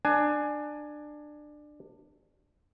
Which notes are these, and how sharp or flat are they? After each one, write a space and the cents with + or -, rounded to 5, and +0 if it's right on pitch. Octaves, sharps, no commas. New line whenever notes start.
D4 +20 G#5 +15